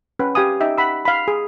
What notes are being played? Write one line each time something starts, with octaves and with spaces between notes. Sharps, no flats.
C#4 B4 F#5 G5
G4 F5 G#5 D#6
D#4 D#5 E5 G5
F#5 B5 E6
F5 B5
G#4